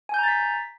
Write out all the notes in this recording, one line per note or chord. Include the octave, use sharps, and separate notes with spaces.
G#5 A#5 G6 A6 B6